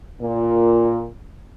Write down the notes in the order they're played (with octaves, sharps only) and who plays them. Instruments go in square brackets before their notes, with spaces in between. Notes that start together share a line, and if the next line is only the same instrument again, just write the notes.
[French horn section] A#2